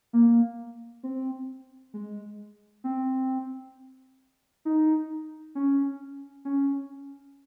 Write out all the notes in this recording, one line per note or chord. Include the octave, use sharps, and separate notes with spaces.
A#3
C4
G#3
C4
D#4
C#4
C#4